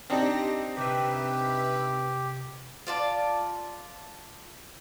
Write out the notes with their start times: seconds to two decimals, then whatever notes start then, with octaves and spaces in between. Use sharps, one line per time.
0.10 C4 D4 D#4 G4 A#6
0.77 C3 G4 B4 E5
2.87 F4 D5 A5